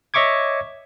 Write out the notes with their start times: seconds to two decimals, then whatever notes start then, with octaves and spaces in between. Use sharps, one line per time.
0.14 C#5 D#5 E5 C#6 D6 G#6